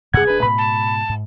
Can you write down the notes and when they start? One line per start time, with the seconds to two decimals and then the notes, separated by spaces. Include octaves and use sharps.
0.14 F#2 C3 G3 G#4 F#5 G#6
0.26 D1 D4 B4
0.43 G#2 B2 B5
0.58 A5
1.09 G#2